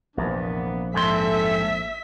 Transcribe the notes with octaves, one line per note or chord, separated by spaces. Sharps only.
A#1 E2 C3 A#3 B3 D4
F2 G#2 A4 E5 C6 B6